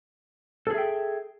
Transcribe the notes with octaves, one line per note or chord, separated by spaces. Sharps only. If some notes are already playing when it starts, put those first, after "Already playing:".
G#4 A4 E5 G5